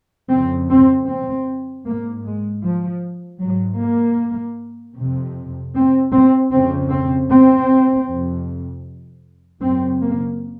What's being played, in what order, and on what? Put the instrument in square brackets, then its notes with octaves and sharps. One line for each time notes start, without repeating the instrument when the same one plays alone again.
[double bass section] F2 C#3 C4
C4
C4
G#2 A#3
G#3
F3
G#2 F#3
A#3
F2 C3
C4
C4
F2 C#3 C4
C4
C4
F2 C3
F#2 C#3 C4
A#3